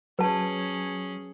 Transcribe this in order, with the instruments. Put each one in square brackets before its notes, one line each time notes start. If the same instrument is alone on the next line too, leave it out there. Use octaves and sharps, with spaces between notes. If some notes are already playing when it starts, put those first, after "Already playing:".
[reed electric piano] F#3 [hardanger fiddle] C#4 G#4 [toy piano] B4 A5